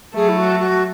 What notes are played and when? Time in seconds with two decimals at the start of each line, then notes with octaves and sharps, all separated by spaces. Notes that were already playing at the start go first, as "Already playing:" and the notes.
0.15 F#3 A3 G#4
0.29 E4
0.38 F#4
0.59 F#4